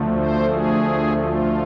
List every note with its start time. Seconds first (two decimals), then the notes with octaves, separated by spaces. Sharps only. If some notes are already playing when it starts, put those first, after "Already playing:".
Already playing: D2 D3 F3 A3
0.15 C5
0.50 G#4
1.20 F4